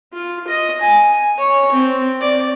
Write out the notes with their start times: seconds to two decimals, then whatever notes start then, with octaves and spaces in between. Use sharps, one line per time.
0.13 F4
0.47 D#5
0.81 G#5
1.38 C#5
1.72 C4
2.21 D5